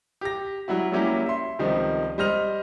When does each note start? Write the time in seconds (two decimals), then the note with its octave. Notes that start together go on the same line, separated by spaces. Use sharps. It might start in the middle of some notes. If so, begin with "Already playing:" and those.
0.21 G4 A#6
0.68 F#3 G3 E4 F#4
0.92 F#3 G3 A#3 C#4 E4 G4
1.26 E5 C6
1.59 C#2 C3 D#3 F3 G3
2.18 G3 C5 D#5 F6 F7